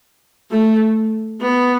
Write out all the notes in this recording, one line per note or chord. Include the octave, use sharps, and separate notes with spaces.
A3
B3